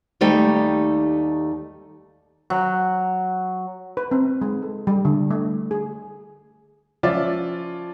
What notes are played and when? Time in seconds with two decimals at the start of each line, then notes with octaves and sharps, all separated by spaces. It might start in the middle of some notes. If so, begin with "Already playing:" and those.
0.21 D#2 G3 A3 D#4 G5
2.50 F#3
3.97 B4
4.11 C4
4.41 G#3
4.62 A4
4.87 G3
5.05 D3
5.30 A3
5.71 G#4
7.03 F3 C#4 F4 C#5 D5 E5